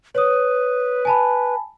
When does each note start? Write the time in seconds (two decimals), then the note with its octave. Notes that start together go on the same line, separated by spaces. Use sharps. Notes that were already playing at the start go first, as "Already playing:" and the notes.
0.15 B4 C#5 D#6
1.05 G#5 A5 B5